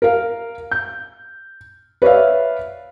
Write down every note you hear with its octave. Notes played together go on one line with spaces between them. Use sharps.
A#4 F5
G6
B4 C#5 D5 E5 F5